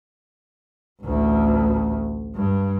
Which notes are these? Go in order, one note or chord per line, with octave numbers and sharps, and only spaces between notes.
A1 D2
G2